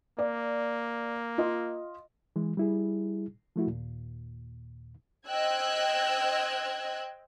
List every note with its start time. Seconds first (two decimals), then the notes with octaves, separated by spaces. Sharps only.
0.19 A#3 D5
1.38 F4 D#5
2.36 E3 G#3
2.57 G3 E4 G#4
3.56 F3 A3 E4 F#4
3.67 D#2 A#2
5.27 C5 D#5 G5 E6 F#6 G#6